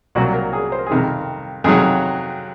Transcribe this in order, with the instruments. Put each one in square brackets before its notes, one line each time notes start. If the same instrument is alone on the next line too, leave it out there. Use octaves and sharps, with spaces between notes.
[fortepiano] C2 A#2 F#3 F#4
A#4
G#4
C5
A#4
G#4
F2 C3 D#3 A#4
F2 C3 D#3 F#3 G#4